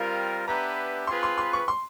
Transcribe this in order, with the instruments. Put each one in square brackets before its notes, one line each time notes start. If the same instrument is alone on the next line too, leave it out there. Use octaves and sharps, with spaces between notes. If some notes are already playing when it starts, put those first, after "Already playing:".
Already playing: [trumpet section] G3 C4 F4 A#4 [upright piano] F5
[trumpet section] B3 D4 G4 B4 E5 [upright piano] A#5
[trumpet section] C4 F4 G#4 B4 [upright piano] C6
[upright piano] C6
C6
C#6
C6